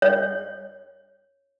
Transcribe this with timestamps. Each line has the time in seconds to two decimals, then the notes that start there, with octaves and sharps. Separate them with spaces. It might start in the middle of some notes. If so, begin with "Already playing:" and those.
0.02 C#5